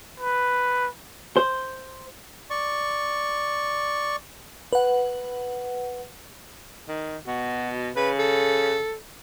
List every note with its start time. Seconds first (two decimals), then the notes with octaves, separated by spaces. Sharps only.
0.20 B4
1.37 C5
2.50 D5 C#6
4.73 B4 F#5
6.88 D#3
7.27 B2 F#4
7.96 C#3 B4
8.18 A4